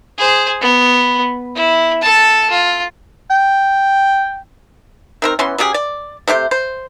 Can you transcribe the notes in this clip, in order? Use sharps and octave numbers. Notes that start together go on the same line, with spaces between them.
G#4 C5
B3
E4
A4 A5
F4
G5
D#3 C4 A#4
E3 B3 C#4 C6
F#3 C#4 G4 G#4
D5
C3 A3 G4 C5
C5